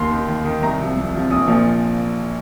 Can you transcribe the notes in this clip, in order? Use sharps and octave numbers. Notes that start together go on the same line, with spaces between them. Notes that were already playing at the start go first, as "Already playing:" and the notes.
Already playing: D#2 C6
D#3
D#2
D#3
C2 A#5
C3 F3
C2
C3 F3
A#1 D#6
A#2 F3